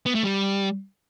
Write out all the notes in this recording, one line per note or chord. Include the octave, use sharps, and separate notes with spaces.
B3
A3
G3